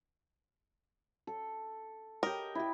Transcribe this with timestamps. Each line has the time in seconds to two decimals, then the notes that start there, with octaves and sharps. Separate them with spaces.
1.27 A4
2.23 G4 A#4 D#5
2.55 E4 G4